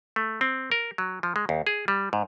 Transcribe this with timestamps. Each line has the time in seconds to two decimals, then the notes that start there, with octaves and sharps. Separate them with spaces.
0.16 A3
0.41 C4
0.72 A#4
0.98 F#3
1.23 F3
1.36 G#3
1.49 D#2
1.67 G#4
1.88 G3
2.13 G#2